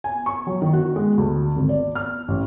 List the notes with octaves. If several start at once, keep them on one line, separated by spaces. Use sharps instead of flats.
G#5
C#6
F#3
D#3
F#4
G#3
D2
G#1
D5
F6
A1